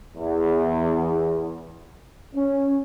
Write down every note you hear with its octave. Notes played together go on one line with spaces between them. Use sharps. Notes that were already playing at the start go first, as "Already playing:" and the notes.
E2
C#4